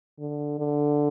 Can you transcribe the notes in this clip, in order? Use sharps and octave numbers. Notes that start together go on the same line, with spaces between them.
D3
D3